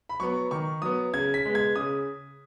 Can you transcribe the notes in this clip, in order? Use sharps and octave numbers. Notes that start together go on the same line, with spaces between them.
B5
F#3 B3 C#6
D#3 C#6
F#3 B3 D#6
C#3 G#6
B6
G#3 B3
G#6
C#3 D#6